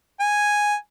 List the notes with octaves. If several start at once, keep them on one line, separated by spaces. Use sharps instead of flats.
G#5